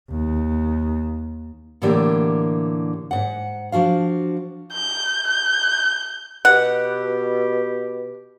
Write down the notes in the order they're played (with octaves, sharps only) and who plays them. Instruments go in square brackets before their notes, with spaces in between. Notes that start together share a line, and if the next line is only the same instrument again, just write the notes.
[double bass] D#2
[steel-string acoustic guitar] A2 D3 E3 A#3 G4 D5
G#2 F#5
F3 D4 F#4 F5
[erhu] G6
G6
[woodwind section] B2 G4 [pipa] F#5